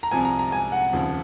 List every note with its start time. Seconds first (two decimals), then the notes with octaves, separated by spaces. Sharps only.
0.03 A#5
0.11 C2 C3 F3 G#5
0.25 A#5
0.39 A#5
0.52 G#5
0.72 F#5
0.92 F1 D#2 C#3 F3